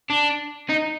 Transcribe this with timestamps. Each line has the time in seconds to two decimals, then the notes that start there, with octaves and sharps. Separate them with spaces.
0.10 D4
0.69 D#4